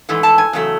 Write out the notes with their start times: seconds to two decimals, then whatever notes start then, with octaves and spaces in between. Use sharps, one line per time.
0.09 G#2 E3 A3
0.23 A5
0.38 G#5
0.53 E2 C#3 F#3 A3